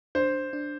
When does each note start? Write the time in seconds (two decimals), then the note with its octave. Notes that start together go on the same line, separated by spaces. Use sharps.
0.15 D4 C5
0.53 D4